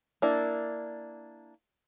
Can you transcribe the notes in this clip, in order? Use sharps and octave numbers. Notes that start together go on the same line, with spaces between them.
A#3 D4 E4